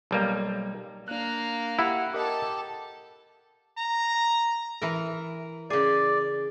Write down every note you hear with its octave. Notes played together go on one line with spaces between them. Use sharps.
B1 G3 A#3
A#3 D4 F5 F#6
E4 G4 F#5
G4 A4 A#4 D#5 A5
A#5
E3 A#4
C#3 G#4 D5